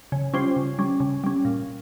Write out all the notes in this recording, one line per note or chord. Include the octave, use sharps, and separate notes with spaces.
C#3
G3 C#4 F4 C5
C#3
G3 C#4
C#3
G3 C#4
A#2